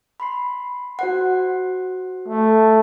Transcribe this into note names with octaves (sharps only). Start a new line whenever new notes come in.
B5 C6 C7
F#4 C5 F#5
A3